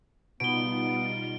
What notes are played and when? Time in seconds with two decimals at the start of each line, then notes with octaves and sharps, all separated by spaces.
0.40 B2 G3 B3 D#4 F4 D7 G7